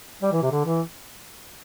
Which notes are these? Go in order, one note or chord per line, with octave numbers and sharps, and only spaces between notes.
G3
E3
C3
D3
E3